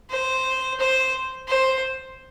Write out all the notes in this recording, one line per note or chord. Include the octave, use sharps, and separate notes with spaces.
C5
C5
C5